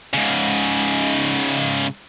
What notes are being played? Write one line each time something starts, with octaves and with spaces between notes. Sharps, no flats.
G#2 C#3